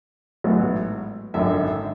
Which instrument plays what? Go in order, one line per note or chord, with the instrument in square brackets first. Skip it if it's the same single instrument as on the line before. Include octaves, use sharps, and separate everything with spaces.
[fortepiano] A1 G#2 F#3 B3
G#1 F#2 D3 E5